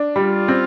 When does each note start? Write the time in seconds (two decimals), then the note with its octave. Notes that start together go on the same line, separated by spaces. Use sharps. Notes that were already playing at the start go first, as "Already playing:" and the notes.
Already playing: D4
0.16 G3 F4
0.48 C4